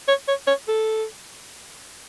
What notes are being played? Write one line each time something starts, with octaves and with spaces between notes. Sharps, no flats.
C#5
C#5
C#5
A4